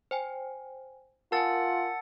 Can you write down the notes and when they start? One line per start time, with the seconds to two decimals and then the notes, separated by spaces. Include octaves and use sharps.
0.11 C5 G5 G#5
1.32 F4 A#4 F#5 G#5 A5 E6 A6